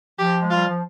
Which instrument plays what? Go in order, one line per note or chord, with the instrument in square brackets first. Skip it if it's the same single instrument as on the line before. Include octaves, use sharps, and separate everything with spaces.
[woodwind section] F3 [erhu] G4
[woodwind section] G#3
[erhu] F4
[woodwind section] G3
F3